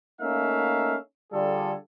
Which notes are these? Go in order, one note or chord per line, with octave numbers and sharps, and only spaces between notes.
A3 A#3 C#4 D#4 E5 F5
D3 G3 D4 F4 G#4 A4